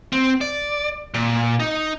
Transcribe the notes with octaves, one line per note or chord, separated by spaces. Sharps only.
C4
D5
A#2
D#4